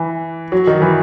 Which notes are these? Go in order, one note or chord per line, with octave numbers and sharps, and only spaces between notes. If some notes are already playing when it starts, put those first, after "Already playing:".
Already playing: E3
F#3
D#3
E3